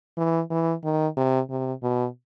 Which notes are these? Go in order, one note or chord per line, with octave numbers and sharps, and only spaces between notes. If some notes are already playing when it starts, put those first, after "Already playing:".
E3
E3
D#3
C3
C3
B2